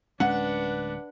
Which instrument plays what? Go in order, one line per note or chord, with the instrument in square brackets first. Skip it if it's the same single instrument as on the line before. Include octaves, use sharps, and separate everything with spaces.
[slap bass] D1 G#3 C#4 [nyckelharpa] D4 B4 [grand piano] F#5